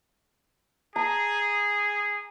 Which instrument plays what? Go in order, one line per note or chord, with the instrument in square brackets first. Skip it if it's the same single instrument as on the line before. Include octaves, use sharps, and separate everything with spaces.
[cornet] G#4 [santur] A#5